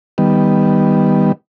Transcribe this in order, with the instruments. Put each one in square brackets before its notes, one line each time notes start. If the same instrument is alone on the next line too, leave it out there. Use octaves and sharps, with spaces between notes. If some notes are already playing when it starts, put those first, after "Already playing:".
[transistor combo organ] D#3 G3 B3